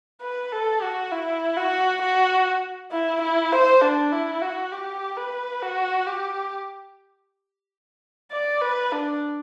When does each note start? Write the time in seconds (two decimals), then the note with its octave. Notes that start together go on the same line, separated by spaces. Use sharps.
0.22 B4
0.52 A4
0.82 F#4
1.12 E4
1.57 F#4
2.02 F#4
2.92 E4
3.22 E4
3.52 C5
3.82 D4
4.12 E4
4.42 F#4
4.72 G4
5.17 B4
5.62 F#4
6.06 G4
8.32 D5
8.61 B4
8.92 D4